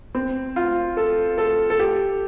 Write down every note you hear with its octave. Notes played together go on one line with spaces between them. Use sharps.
C4
F4
A4
A4
A4
G4